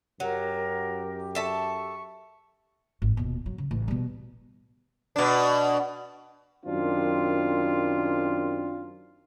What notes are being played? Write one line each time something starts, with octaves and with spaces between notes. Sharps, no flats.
F#2 F#3 G4 A#4
A4 E5 A5 C#6
G#1
D#1 B2
F#3
C#3
A1
B2 G3
B2 D4
F#2 D#3 C4 D4 F4